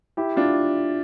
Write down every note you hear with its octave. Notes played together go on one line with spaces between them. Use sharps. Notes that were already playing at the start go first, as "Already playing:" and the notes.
E4 G4
D4 F4